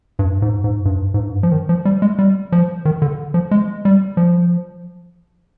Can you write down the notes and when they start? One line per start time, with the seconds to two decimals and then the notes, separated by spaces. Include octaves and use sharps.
0.19 G2
0.42 G#2
0.64 G#2
0.85 G2
1.14 G#2
1.20 G2
1.43 F3
1.52 D#3
1.69 F3
1.85 G3
2.02 G#3
2.19 G3
2.52 F3
2.85 D#3
3.02 D3
3.34 F3
3.51 G#3
3.85 G3
4.17 F3